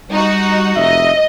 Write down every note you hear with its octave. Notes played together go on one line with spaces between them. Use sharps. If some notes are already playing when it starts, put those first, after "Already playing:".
G3 D#4 F#4
F1 D#5 E5